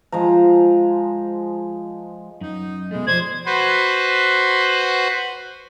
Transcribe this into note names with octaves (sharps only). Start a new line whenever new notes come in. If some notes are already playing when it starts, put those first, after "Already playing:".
F3 G#3 C5 A#5
F#2 D#4
B2 G#3 A3
F3 C5 D5 G#6
F#4 B4 C5